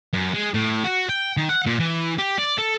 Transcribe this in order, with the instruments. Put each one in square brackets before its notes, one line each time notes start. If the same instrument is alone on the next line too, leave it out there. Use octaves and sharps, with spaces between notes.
[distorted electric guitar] F#2
G#3
A2
F#4
G5
D#3
F#5
A#2
E3
G4
D5
A4